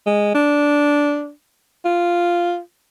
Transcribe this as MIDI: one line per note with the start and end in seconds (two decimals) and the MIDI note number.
0.06 0.34 56
0.35 1.30 62
1.85 2.59 65